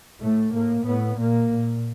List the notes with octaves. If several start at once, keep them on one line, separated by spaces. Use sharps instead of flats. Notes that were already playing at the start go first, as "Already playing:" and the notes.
A2 A3
A2 A#3
A2 B3
A#2 A#3
A#2